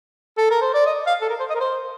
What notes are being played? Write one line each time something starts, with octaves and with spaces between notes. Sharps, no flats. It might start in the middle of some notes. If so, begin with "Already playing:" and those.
A4
A#4
C5
D5
D#5
F5
A4
A#4
C5
D#5
A#4
C5